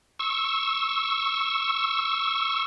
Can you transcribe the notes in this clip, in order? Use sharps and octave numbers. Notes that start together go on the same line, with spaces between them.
C#6 E6